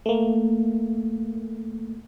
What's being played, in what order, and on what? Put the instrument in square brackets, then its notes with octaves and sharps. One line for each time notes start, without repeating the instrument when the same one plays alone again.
[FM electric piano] A3 A#3